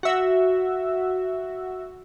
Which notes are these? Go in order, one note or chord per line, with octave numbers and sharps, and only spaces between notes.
F#4 E5